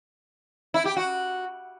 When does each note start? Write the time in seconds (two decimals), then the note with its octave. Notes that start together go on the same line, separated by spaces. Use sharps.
0.74 E4
0.85 G4
0.96 F#4